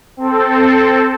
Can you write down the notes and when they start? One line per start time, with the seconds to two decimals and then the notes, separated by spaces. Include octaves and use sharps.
0.17 C4 A4